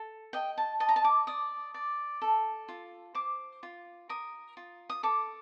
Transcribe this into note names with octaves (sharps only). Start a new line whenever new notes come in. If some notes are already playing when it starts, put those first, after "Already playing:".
Already playing: A4
D#5 G5
A5
D#5 A5
A#5
A5
D6
D5 D#6
D5
A4
F4
C5 D6
F4
A#4 D#6
F4
D#6
A4 D6